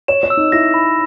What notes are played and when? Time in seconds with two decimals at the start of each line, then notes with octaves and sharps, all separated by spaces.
0.08 C#5 E7
0.23 C#5
0.30 E6
0.37 D#4
0.52 E4 A#6
0.74 B5